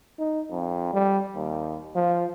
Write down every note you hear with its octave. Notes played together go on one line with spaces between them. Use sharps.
D#4
F2
G3
D#2
F3